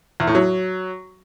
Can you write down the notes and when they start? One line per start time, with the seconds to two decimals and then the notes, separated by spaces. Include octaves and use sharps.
0.20 E2
0.27 A2
0.35 F#3